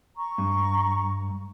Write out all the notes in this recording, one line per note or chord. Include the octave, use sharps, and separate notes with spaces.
A#5 C#6
G2